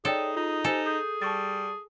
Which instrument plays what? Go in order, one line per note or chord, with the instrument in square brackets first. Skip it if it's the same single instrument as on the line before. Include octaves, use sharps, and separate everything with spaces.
[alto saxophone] D#4 [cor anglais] G#4 [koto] A4 [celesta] C#5 D5 G5
[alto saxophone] D#4 [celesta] F4
[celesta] G4 C5 G#5 [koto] A4
[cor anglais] G#4 [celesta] G6
[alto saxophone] G3 [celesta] A5 C#6 A6